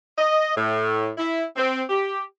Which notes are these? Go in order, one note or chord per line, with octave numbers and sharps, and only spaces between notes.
D#5
A2
E4
C4
G4